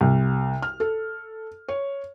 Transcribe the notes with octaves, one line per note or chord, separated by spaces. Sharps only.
C2
F6
A4
C#5